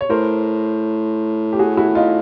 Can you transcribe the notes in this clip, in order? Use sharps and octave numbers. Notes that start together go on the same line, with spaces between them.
C#5
A2 A#4 C5
G4
F#4 G#4
E4 F#4
D#4 F4